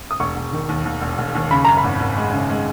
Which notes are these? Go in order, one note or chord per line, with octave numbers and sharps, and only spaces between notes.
D#6
E1 C#6
E1
D#3
D#2
D#2
E1
E1
D#2
C#3 B5
F#2 A#5
B5
G#1
G#1
G#3
C#3
G#3